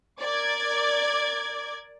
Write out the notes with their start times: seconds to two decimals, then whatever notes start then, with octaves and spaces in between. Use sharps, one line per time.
0.23 A#4 D5 D6 G#6